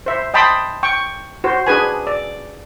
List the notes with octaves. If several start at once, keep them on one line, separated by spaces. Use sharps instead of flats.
C5 E5
D#5 G5 A5 B5 C6 D#6
G5 C#6
F#4 C5
D4 G#4 B4 G#5
D5